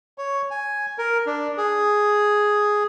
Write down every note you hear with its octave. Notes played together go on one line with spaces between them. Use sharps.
C#5
G#5
A#4
D4
G#4